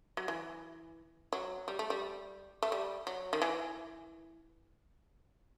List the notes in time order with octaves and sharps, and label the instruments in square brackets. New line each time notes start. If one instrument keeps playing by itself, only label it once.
[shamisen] F#3
E3
F#3
G3
A3
G3
A3
G3
F#3
D#3
E3